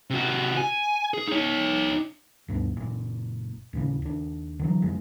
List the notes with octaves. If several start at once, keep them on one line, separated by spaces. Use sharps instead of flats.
C3 F#4
G#5
G#4
D#4 C#5
D2 G2 B2
F#1 A#2
D#2 A2 C#3
D#2 D4
D3 E3 F#3
F#1 F2 G#3